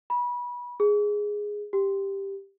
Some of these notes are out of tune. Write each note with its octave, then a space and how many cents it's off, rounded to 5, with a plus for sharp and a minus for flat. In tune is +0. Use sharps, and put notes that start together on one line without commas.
B5 -25
G#4 -5
G4 +5